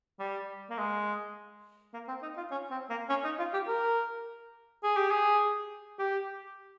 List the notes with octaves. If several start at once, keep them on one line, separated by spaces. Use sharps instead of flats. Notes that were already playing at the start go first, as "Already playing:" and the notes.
G3
A#3
G#3
A#3
C4
D#4
F4
C#4
C4
A#3
C#4
D#4
F4
G4
A#4
G#4
G4
G#4
G4